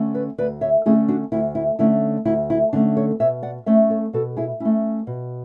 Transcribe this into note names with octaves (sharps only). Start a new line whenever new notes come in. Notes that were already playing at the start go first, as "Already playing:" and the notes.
Already playing: D3 A3 C#4
B4 D5
D2 B4 D5
C#5 E5
D3 A3 C#4 E4 G#4
D4 F#4
D2 E4
E4
D3 A3 C#4 E4
D2 E4
E4
D3 A3 C#4 D4
A4 C#5
B2 C#5 E5
D5 F#5
A3 C#4 C#5 E5
A4 C#5
B2 F#4 A4
E4 G#4
A3 C#4 E4
B2